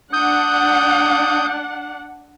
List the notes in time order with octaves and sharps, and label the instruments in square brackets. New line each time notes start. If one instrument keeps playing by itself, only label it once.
[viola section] D4 F#5 [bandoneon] D#6 G6